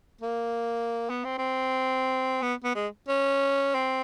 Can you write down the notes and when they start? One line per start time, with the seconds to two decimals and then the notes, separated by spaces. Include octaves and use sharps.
0.21 A#3
1.10 B3
1.25 C4
1.39 C4
2.43 B3
2.64 B3
2.76 G#3
3.08 C#4
3.75 C4